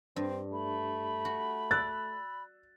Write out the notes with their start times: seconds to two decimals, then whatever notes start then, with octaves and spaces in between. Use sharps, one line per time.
0.16 G2 C4
0.53 A3 B5
1.25 F#4
1.71 D5 E6 F#6 A6